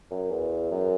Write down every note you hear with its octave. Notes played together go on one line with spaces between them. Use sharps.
F#2
E2
F#2